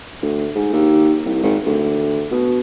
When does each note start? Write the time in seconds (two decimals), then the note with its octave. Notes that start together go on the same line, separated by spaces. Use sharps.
0.22 D2
0.55 G#2
0.73 D#2
1.25 C2
1.43 G#1
1.66 D2
2.31 B2